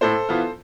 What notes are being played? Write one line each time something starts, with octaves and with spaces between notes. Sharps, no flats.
A2 A4 C5
E3 B3 F4